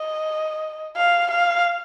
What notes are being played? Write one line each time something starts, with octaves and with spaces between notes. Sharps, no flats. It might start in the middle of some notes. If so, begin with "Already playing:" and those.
Already playing: D#5
F5
F5